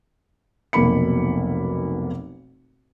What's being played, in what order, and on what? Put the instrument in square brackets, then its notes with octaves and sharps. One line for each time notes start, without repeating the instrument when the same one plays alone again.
[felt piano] F1 B1 B2 A#3 B5 C#7